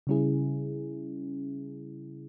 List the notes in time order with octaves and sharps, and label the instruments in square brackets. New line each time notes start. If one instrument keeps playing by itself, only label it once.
[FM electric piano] C#3 G3 C#4 E4 G#4